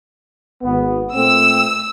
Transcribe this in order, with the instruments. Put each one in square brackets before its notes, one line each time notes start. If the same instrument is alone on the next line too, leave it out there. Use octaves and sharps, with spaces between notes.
[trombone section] G#1 B3
[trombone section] A#2 A3 C4 [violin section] E6